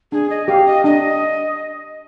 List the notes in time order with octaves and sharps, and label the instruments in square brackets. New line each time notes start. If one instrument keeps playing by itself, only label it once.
[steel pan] D4 [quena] G#4
[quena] D#5
[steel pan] G4 [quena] F5
[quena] D#5
[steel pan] D4 [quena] D#5